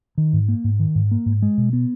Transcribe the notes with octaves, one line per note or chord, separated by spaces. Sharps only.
D#3
G#2
A#3
G#2
D#3
G#2
A#3
G#2
G#3
B2
B3